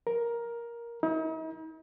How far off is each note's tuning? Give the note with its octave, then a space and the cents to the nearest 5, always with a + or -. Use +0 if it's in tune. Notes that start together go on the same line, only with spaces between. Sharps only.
A#4 +10
D#4 +45